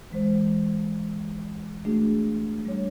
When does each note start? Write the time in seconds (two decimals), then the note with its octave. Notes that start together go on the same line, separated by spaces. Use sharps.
0.11 E3 G#3 C5
1.85 A3 D4 F#4 G#4
2.65 G3 D4 C#5